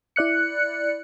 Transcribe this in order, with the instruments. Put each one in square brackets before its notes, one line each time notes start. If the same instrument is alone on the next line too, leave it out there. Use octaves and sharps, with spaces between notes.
[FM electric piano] E4 D5 F#6 C#7